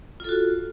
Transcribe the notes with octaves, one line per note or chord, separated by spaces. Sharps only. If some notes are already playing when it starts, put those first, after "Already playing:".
F4 F#4 A4